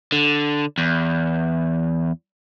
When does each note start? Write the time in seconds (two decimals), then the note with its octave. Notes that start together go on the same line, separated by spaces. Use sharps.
0.12 D3
0.78 E2